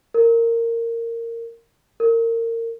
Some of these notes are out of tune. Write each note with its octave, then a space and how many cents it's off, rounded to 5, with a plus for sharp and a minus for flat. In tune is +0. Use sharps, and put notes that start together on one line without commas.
A#4 -15
A#4 -25